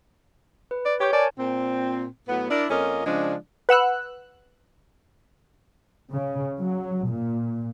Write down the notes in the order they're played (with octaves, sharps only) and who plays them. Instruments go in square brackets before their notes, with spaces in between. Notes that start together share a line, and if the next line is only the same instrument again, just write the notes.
[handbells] B4
[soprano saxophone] D5
[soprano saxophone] G4 [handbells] C#5 C#6 G6
[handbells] A#4 G#5 A5 [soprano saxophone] D5
[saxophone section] A#2 C4
A2 F#3 B3
D4 E4 A#4 D5
F2 A#3 C#4 F4 D#5
C#3 F3 G#3 D4
[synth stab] B4 F#5 E6 F#6
[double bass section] C#3
F#3
A#2